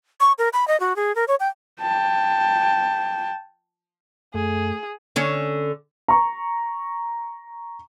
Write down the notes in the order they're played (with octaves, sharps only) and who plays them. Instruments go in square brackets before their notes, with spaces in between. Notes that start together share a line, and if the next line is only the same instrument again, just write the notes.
[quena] C#6
A#4
B5
D#5
F#4
G#4
A#4
C#5
G5
[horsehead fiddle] G5 A5
[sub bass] F#2 [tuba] A3 [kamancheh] G#4
[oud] D3 C#4
[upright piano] A#5 C#6